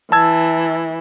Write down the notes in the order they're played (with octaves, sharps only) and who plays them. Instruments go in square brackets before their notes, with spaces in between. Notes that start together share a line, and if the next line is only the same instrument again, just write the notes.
[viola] E3 [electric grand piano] A5 E6 G#6